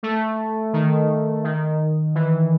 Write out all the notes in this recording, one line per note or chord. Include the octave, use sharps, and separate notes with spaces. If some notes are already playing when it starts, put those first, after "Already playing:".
A3
D#3
D#3
E3